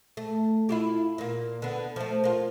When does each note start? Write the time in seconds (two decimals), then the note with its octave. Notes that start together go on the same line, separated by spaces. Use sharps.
0.17 A3
0.69 E4 F4 G4
1.18 A#2 A#3
1.62 D3 B3
1.96 F3 A3
2.24 A#3 F4